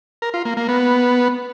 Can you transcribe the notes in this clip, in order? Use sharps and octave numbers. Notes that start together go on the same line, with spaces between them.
A#4
F4
A#3
A#3
B3